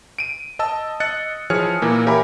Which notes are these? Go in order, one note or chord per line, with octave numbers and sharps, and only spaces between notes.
D7 D#7
D#5 A5 E6
D#5 F#6 A6 C#7
E3 F3 G#4 C#5 F6 C#7
A#2 E3 A#3
G4 A#4 C#5 E5 G#5 B5